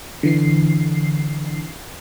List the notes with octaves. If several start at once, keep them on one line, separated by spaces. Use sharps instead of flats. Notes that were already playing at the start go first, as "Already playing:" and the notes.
D3 E3 C7